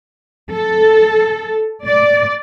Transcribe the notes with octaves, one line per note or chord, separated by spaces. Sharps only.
A4
D5